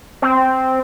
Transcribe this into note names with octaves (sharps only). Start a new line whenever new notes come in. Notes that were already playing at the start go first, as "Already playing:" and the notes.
C4